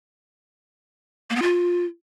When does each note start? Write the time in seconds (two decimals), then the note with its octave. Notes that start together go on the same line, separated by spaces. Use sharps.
1.30 A#3
1.36 B3
1.42 F4